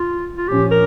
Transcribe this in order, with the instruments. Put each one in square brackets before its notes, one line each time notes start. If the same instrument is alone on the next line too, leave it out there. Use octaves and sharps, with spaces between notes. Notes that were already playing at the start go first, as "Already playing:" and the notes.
Already playing: [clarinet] F4
F4
[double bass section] A#2 F3 C#4 [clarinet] G4
[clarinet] A#4